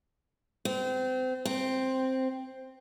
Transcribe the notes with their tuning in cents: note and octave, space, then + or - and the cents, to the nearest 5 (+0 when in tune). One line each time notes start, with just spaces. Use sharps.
C4 -30
C4 +0